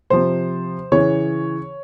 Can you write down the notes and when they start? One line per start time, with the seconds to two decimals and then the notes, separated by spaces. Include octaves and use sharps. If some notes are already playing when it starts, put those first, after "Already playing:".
0.10 C3 F3 C5
0.92 C#3 E3 C#5